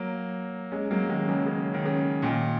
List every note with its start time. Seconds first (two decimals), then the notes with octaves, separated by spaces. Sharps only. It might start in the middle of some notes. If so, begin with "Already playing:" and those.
Already playing: F#3 A#3
0.72 G#3 C#4
0.91 F#3 A#3
1.09 D#3 G#3
1.28 C#3 F#3
1.47 C#3
1.74 D#3
1.85 C#3
2.22 A#2 D#3